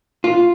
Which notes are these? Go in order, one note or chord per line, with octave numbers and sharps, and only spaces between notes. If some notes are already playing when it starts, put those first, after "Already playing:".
F4